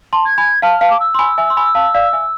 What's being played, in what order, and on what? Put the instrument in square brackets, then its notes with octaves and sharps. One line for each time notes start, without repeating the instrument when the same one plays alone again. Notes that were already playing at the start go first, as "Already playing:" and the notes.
[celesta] A5 C6
[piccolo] G#6
[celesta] G#5 B5
[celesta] F5 A5 [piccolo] F6
[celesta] F5 A5
[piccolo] D6
E6
[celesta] C6
G#5 B5
E5 G#5
C6
G#5 B5
F5 A5
D5 F5
E5 G#5